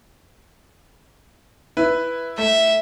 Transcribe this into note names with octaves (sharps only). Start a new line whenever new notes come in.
E4 B4
A3 E5